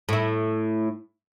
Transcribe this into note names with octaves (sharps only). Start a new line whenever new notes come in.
A2 E4